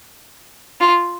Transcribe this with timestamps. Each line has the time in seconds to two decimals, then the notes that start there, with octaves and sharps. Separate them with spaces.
0.80 F4